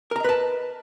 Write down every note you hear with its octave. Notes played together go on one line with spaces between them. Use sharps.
A#4 B4 D#5 A5 A#5